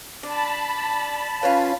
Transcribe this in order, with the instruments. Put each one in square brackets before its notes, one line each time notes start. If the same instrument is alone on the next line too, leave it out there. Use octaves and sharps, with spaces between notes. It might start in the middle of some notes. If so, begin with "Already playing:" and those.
[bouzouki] D4 [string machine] A5 B5
[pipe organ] C#4 F4 [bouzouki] B4 C#5 F5